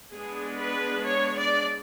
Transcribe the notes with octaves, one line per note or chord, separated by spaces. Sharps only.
G#3 B3 D4 G#4
B4
C#5
D5